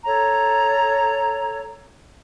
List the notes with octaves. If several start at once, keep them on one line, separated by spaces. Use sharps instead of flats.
A4 C#5 A#5